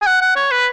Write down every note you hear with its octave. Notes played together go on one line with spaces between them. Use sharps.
G#5
F#5
F#5
C#5
B4